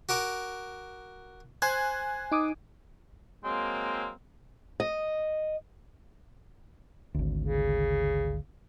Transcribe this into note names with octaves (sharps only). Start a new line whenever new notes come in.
F#4 A#4 D6
C5 G#5 F#6 G#6
D#4 D6 D#6
F#3 G#3 A#3 C4
D#5
G#1 D2
C#3